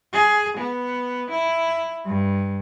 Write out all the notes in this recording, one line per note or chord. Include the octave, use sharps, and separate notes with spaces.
G#4
B3
E4
G2